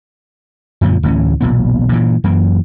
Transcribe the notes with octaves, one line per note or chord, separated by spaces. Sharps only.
F#2 A#2 D3 F3
D2 A2 E3 C#4
E1 B1 A#2 B3
G2 A#2 E3
F#2 E3 A#3